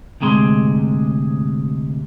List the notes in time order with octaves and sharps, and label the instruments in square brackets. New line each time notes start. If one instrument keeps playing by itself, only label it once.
[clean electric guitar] D2 G#2 C3 G#3 A#5 C6